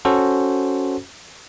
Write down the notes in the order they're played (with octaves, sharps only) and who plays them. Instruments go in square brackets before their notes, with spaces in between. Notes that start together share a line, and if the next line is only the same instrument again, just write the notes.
[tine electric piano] C#4 F#4 A4 C5